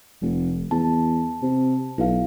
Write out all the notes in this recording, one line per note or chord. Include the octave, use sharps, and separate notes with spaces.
F1
E2 A5
C3
B1 E4 F5